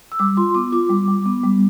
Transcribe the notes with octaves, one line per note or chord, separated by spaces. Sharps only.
E6
G3 D6
F4 C6
B3 D6
F4 D6
G3
G3
B3
G3